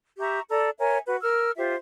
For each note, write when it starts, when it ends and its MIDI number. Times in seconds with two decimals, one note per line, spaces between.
0.19 0.40 67
0.19 0.40 76
0.19 0.40 82
0.19 0.40 85
0.49 0.69 69
0.49 0.69 74
0.49 0.69 82
0.79 0.98 70
0.79 0.98 73
0.79 0.98 76
0.79 0.98 80
1.07 1.16 66
1.07 1.16 71
1.21 1.51 70
1.21 1.51 88
1.21 1.51 89
1.57 1.75 65
1.57 1.75 67
1.57 1.75 72
1.57 1.75 76